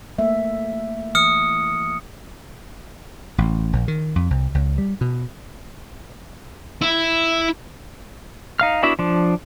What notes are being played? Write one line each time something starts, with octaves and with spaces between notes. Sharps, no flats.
A3 A#3 E5
E3 D#6 F6 C#7
A1
A#1
D#3
F2
C2
C#2
G3
B2
E4
D#4 F5 F6
B3 D4 E4 F#4 E5
F3 D4